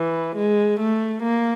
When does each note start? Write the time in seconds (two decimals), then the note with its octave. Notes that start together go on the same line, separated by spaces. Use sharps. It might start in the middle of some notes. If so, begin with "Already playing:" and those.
Already playing: E3
0.36 G#3
0.80 A3
1.23 A#3